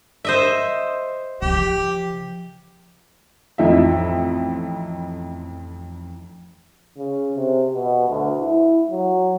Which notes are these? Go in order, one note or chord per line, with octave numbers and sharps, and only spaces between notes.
C5 D#5 E5
C#3 F3 G4
A1 F2 D#4 E4 E5
C#3
C3
B2
D2
E4
F#3